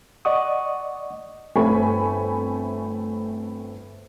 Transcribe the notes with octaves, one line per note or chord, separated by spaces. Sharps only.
D5 D#5 F#5 C#6 D#6
G1 A3 C4 G#5 B5 C#6